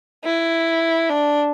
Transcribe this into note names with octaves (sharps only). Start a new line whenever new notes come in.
E4
D4